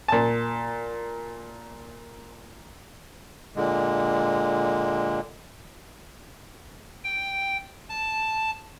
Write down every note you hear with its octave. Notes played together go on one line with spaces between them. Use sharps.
A#2 A5
A#2 D3 G#3
G5
A5